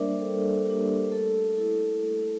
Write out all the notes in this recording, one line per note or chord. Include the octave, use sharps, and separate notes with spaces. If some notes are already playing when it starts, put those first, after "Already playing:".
Already playing: G3 A#3 D4 A#4 C5 D5 E5
G3 A4 C5
A#3 D4 G4 A#4
A3 A4
E4 A4
A3